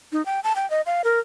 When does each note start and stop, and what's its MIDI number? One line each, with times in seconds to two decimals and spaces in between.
0.12 0.24 63
0.26 0.40 79
0.44 0.55 81
0.56 0.68 79
0.70 0.81 75
0.86 1.02 77
1.04 1.20 70